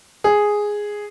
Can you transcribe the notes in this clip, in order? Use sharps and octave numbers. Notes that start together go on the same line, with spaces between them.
G#4